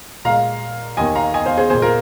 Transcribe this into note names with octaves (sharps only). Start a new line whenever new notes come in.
A#2 G#3 F5 A#5
D#2 D#3 A#3 D#5 G#5
F5 A#5
D#5 G#5
C5 F5
G#4 C5
A#2 A#3 G#4 C5
F4 A#4